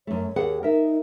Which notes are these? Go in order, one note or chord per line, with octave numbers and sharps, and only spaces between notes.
F#2 A3 C#5
D#2 G#4 F#5
D#4 A#4 E5